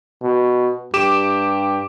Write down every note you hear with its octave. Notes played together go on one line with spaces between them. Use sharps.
B2
G2 G4 D6 E7